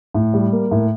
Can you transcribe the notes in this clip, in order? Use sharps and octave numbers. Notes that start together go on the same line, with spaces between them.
A2
G3
A#3
A2